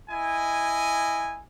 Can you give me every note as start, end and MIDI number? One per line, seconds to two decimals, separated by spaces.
0.10 1.41 64
0.10 1.41 75
0.10 1.41 80